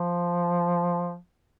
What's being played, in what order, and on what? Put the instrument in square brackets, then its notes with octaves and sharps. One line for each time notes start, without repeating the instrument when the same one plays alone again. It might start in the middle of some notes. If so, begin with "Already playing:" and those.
Already playing: [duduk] F3